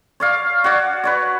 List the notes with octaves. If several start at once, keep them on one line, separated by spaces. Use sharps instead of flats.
C#5 D5 F5
F#4 C#5 D5
B4 C#5 D5